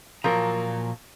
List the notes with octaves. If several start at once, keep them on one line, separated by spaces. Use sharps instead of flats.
A#2 F3 F#3 A#4 A#5